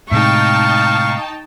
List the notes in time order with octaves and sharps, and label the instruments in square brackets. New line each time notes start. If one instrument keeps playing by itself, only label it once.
[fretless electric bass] A2 C3 G#3 [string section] D#4 G5 A5 [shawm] F5 [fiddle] C#6